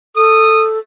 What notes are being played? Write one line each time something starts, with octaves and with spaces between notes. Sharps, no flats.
A4 D#6